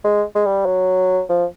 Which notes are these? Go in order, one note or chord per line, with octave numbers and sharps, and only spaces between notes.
G#3
G#3
G3
F#3
F3